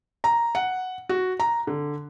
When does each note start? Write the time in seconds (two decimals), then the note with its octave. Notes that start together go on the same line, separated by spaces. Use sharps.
0.24 A#5
0.55 F#5
1.09 F#4
1.40 A#5
1.67 D3